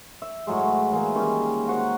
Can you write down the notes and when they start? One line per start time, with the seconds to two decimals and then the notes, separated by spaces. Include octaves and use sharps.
0.22 E5
0.47 A2 F#3 G#3
0.64 B4
0.91 E3 G#3 A#3
1.15 D#3 G3 G#3 C#4
1.68 F#4 C5 F#5